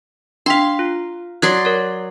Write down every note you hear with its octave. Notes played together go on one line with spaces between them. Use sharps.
D4 F5 G5 C6 B6
F4
F#3 D5 C6 D#6 F#6 G#6
A#4 C#5